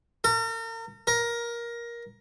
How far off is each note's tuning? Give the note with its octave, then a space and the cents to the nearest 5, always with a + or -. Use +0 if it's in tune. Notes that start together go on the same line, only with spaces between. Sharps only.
A#4 -40
A#4 +15